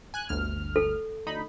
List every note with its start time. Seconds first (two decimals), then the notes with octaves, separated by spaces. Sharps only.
0.14 G#5 F#6
0.29 G1 D2 F6
0.76 A4
1.27 D2 D#4 B5